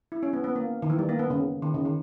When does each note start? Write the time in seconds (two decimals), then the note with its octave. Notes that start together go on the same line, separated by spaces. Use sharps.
0.12 E4
0.23 C#4
0.33 B3
0.44 B3
0.56 A#3
0.82 D#3
0.90 E3
0.99 G3
1.09 A#3
1.19 B3
1.30 C#3
1.62 D#3
1.74 C#3
1.85 D#3